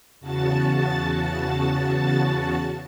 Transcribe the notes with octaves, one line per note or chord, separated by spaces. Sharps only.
E2 C#3 F#4 A5 A6